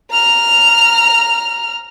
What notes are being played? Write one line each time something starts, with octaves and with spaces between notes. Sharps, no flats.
A#5 F6